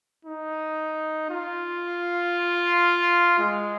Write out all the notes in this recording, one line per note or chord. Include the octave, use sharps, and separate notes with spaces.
D#4
F4
G#3